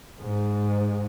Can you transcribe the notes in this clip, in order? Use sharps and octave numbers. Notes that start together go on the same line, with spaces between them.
G#2